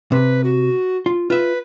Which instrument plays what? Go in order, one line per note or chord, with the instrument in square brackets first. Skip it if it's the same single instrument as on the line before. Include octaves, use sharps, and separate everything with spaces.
[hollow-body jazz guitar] C3 [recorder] B4
[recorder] F#4
[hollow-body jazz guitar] F4
[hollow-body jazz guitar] F4 E5 [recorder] B4